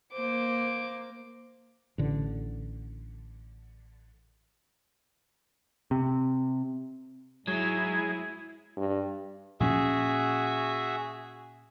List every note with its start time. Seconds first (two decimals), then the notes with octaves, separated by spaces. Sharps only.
0.13 A#3 C5 D6
1.98 A1 D3
5.91 C3
7.47 G#2 F#3 G#3 E4 G#4
8.77 G2
9.60 A#2 F3 C#4 F#4 G#4 E5